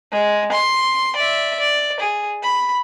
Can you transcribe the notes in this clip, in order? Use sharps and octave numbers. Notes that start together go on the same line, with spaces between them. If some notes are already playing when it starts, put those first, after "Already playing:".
G#3
C6
D5 E5
D5
G#4
B5